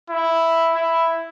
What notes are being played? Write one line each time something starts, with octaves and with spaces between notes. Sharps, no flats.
E4
E4